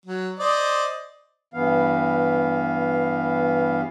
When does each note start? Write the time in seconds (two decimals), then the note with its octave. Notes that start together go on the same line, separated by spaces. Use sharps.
0.05 F#3
0.39 C5 D5 D#5
1.54 G2 E3 B3 F5